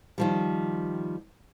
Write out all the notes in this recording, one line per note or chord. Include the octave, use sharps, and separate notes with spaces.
D#3 F3 G3